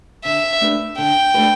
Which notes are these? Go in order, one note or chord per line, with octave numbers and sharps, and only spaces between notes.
D3 E5
A3 D4 G4 B4
D3 G5
A3 D4 G4 B4